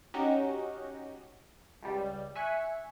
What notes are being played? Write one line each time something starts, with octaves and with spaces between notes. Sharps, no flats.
C#4 D#4 F#4 G4 D#5
C#2 G3
E5 G#5 C#6 F#6